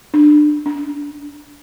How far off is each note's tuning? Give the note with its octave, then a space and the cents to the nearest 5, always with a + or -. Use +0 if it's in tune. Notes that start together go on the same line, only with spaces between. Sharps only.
D4 +25
D4 -25